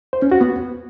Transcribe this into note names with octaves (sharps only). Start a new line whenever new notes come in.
C5
C#4
F#4
B3